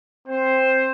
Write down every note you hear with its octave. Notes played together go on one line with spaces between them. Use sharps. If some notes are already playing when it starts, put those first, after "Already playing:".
C4 C5